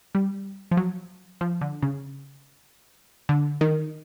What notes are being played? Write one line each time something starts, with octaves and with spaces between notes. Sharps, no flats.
G3
F3
F#3
F3
D3
C#3
D3
D#3